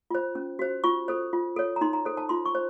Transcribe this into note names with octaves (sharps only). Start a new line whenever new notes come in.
F4 C5
C#4
F#4 C5
F4 C#6
A4 C5
F4
A4 C#5
A#5
D#4 C6
A#5
A4 C5
A5
F4 C6
C#6
C5